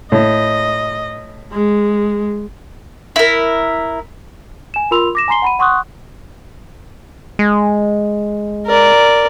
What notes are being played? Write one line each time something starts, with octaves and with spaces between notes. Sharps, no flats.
A2 D#5
G#3
E4 A#4
G#5 E7
F4 A#4 B5 C6 E6 F7
D6 A#6 E7
G#5 A#5 C6 C7 G7
F#5 B5 D#7
F#5 C6 C#6 D#6 F#6
G#3
A#4 D5